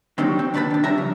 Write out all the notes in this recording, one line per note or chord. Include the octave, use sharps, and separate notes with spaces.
D#3 F#3 C4 D4 D#4 G4
C4
D#3 D4 B4 C5 A5 B5
D#3 D4
C#3 G3 C#4 E5 A#5
F3